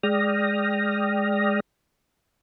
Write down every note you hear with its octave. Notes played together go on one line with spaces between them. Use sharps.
G#3 D5 G5 D#6 F6 A#6